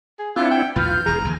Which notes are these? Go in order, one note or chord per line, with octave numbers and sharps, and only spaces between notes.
G#4
C4 D4 E4 F4 E5 F#5
G5
B1 E2 A#2 F4 B4 F6 G6
E1 E3 G#4 A#5
A#1 D#2 G#5